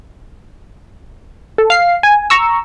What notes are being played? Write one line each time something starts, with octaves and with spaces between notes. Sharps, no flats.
A4
F5 C7
G#5
A#5 C#6 E6